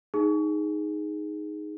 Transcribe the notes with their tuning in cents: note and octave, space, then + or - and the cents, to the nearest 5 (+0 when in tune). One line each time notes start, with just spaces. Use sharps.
D#4 +0 G#4 +0